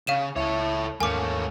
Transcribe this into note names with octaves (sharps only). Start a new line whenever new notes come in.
C#3 F5 D#7 E7
C#2 E4 A4 C#5
D#2 G#2 A3 A#3 C#4 G#5 D6